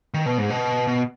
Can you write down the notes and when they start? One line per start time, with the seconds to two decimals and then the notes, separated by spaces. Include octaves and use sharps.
0.14 D#3
0.26 B2
0.38 G#2
0.50 B2
0.87 B2